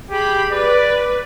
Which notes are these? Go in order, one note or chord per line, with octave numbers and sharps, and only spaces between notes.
G4 G#4 B5
B4 D5